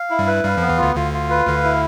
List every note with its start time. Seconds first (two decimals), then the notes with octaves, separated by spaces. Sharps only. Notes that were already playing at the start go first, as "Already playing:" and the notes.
Already playing: F5
0.10 E4
0.19 G2 G3
0.27 B4
0.44 G2 G3 F5
0.57 F2 F3 B3
0.69 E2 E3
0.78 D2 D3 F4
0.95 D2 D3 F4
1.13 F4
1.30 B4
1.46 D2 D3 F5
1.64 E4